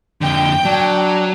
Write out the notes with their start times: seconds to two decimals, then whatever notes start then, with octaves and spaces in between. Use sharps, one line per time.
0.21 F2 D3 G5
0.65 F#3 D4